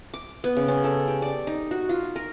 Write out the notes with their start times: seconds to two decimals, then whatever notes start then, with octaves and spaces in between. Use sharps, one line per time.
0.14 D6
0.44 B3
0.57 C#3
0.68 C#4
0.84 A4
1.08 G4
1.22 D5
1.47 D#4
1.71 F#4
1.89 F4
2.16 A#4